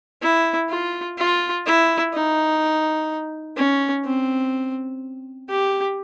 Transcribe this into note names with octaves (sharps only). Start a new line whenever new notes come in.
E4
F4
F4
E4
D#4
C#4
C4
G4